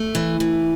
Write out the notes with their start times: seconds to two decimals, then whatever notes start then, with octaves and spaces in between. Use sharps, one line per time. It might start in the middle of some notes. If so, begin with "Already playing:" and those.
Already playing: A3
0.15 E3
0.40 E3